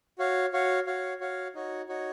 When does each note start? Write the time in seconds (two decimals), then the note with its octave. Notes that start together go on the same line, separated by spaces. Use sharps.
0.18 F#4 C#5 F5
0.53 F#4 C#5 F5
0.87 F#4 C#5 F5
1.21 F#4 C#5 F5
1.55 D#4 F#4 C#5
1.89 D#4 F#4 C#5